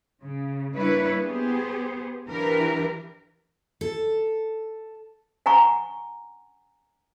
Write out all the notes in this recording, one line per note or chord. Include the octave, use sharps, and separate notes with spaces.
C#3
G3 A#3 D4 E4 B4 C#5
B3 G4 G#4 C5
E3 F3 D4 G4 A#4 B4
A4
F#5 G#5 A#5 C#6